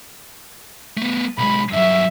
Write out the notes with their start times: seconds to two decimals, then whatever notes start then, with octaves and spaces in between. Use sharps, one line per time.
0.97 A3 B3
1.38 B1 G#3 B5
1.73 G2 F#3 E5